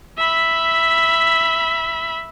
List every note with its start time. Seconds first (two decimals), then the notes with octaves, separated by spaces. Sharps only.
0.17 E5 B5